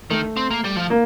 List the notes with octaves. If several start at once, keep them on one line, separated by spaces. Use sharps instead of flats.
D#3 A3
C4
A#3
G3
F3
A#3